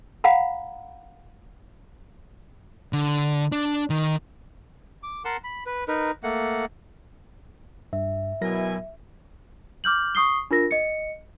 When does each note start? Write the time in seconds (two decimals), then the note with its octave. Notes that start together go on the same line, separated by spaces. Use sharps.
0.24 F5 F#5 A#5 B5
2.93 D3
3.52 D4
3.90 D#3
5.03 D6
5.25 A#4 F#5 A5 C6
5.44 B5
5.66 B4
5.88 D#4 A#4 B4
6.23 A3 A#3 F#5
7.93 G2 E5
8.41 B2 F#3 E4 A#4 G#5 A#6
9.84 D6 F6 G6 F#7
10.15 C#6 D#6 C7 G7
10.51 D4 F4 A#4 A#6
10.71 D#5 C#7